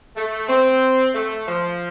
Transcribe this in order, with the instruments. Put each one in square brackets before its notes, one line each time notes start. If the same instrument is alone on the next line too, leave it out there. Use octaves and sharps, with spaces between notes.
[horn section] A3
C4
A3
F3